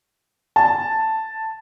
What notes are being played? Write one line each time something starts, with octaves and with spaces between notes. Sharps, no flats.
A5